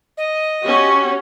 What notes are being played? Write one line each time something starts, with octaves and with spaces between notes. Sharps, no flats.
D#5
C#4 F#4 G4